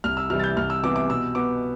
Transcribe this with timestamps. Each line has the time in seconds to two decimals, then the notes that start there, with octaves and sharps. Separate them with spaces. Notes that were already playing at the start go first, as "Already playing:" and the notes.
0.04 C2 F6
0.17 E6
0.30 C3 E3 G3 F6
0.39 A6
0.44 G6
0.57 C2 F6
0.70 E6
0.83 C3 E3 B3 D6
0.96 D6
1.09 B2 E6
1.35 B3 D6